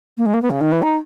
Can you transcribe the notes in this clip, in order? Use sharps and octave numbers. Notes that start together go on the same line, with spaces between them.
A#3
G#3
A#3
B3
C#3
D#3
E3
D#4